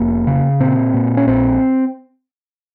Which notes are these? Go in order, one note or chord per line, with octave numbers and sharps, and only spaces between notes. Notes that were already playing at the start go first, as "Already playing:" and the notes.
Already playing: F1 A#3
C#3
A#2 C4
A#2
C#4
A#1 C4